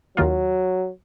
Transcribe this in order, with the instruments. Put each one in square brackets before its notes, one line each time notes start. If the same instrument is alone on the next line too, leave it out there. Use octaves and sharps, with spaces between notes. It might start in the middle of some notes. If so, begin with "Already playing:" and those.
[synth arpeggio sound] D#2 D#3 A#3 F4 [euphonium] F#3